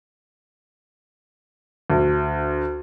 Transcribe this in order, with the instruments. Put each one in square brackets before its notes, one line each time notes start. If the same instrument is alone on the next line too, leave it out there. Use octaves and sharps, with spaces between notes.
[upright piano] D2